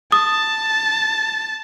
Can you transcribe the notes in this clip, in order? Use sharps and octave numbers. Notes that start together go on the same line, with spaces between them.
A5 D#6